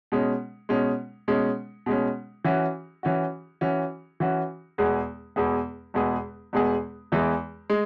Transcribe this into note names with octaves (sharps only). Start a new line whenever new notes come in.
B2 G#3 C#4
B2 G#3 C#4
B2 G#3 C#4
B2 G#3 C#4
E3 C#4 F#4
E3 C#4 F#4
E3 C#4 F#4
E3 C#4 F#4
E2 B2 G#3 B3 G#4
E2 B2 G#3 B3 G#4
E2 B2 G#3 B3 G#4
E2 B2 G#3 B3 G#4
E2 E3 G#3
G#3